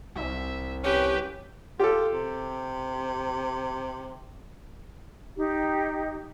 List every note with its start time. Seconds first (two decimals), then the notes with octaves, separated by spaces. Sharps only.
0.16 C2 E5
0.84 C#4 G4 B4 G5
1.80 F4 G4 A4
2.13 C3
5.36 D#4 G4